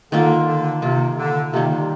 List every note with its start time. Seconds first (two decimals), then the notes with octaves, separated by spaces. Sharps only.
0.12 D3 D#3 A#3 F4
0.48 D3
0.82 C3 D#3 A#3 F4
1.18 D3
1.53 C3 D#3 G3 A#3 F4
1.70 D3